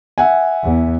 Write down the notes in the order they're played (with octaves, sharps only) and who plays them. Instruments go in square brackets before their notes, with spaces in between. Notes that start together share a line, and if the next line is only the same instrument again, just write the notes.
[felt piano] E5 F#5 G#5
[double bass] E2